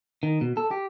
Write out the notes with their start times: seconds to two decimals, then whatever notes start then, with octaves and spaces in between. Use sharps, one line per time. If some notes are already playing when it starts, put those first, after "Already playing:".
0.23 D#3
0.41 B2
0.57 A4
0.71 G4